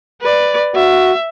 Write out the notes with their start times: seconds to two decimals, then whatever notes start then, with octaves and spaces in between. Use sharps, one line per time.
0.21 B4 D5
0.75 F#4 E5